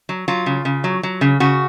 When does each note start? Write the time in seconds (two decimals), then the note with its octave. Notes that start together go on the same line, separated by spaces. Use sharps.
0.09 F#3
0.28 F#3 F4
0.46 C#3
0.65 C#3
0.84 F#3
1.03 F#3
1.21 C#3
1.40 C#3 F#4